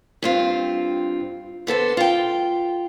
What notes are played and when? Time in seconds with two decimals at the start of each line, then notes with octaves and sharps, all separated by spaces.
0.22 G2 C4 F4
1.67 D3 B3 A4 C5
1.97 F4 G5